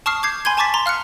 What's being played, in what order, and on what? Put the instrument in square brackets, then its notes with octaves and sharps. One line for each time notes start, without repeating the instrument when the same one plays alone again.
[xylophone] A5 C#6 D#6 F6 C7
D6 G6 G#6 C7
G#5 B5 C6 G6 G#6
G#5 A5 C#6 D6 A6 B6
A#5 C6
F5 F6 F#6 C#7